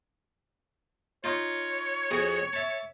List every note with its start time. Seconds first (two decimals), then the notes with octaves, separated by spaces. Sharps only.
1.24 D#4 F4 C#5
2.11 F2 F#4 G#4
2.53 E5 A5